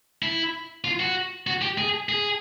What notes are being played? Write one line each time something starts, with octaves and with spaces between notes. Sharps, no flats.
E4
F4
F#4
F#4
G4
G#4
G#4